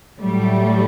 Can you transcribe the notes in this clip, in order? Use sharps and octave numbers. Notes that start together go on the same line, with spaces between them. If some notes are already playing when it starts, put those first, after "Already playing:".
A2 F#3 G3 A3